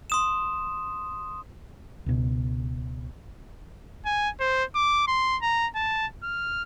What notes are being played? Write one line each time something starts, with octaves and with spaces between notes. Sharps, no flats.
C6 D#6 E7
C#2 B2
G#5
C5
D6
C6
A#5
A5
F6